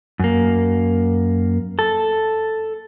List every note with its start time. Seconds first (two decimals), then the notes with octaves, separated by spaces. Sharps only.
0.19 F#2 A#3
1.79 A4